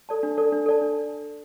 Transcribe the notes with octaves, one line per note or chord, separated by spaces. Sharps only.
A4 D5 A5
D4
A4 D5 A5
D4
A4 D5 A5
D4